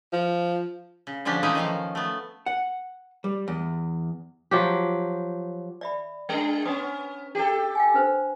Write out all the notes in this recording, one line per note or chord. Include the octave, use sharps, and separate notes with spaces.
F3
C#3
D3 F3 C#4 D4 G4
E3 G#3 A3 C#4 D#4 E4
D#3 F3 A#4 F5
A3 B3
F#5
G3
E2
F3 F#3 G4
D5 E5 B5
G#3 D4
B3 C#4 D#6
G4 A4
F5 G5 G#5
D4 B4 C5